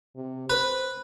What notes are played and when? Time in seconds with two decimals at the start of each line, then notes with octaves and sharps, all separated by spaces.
0.16 C3
0.50 B4 C5